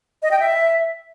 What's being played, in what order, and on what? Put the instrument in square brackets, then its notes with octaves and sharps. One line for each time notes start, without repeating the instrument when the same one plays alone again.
[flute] D#5
G5
E5